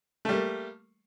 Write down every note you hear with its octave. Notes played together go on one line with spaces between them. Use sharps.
G3 A3 A#3